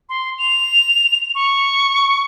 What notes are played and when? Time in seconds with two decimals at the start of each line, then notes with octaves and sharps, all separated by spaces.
0.09 C6
0.39 F7
1.35 C#6